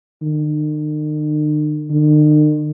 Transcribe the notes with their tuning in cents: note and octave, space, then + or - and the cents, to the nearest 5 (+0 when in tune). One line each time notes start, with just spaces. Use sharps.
D#3 -45
D#3 -45